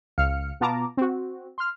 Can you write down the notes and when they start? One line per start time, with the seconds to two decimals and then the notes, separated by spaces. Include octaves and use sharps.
0.18 C#2 F5 F6 C#7
0.60 B2 B3 F4 A5 A#5 D6
0.97 C4 F#4
1.58 C6 F6